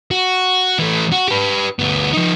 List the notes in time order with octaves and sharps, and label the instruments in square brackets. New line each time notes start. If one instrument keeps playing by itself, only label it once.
[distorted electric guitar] F#4
E3 A3
F#4
G4 B4
D2 B3
F3 D#4